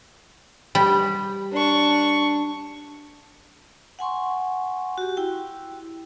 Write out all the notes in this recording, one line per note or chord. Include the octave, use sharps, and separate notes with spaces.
G3
D4 C#6
F#5 G#5 C6 C#6
F#4 G4
E4 G5